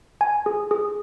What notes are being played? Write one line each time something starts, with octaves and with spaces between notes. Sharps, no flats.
G#5
G#4
G#4